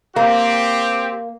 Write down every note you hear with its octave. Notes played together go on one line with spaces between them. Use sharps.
A#3 C4 G4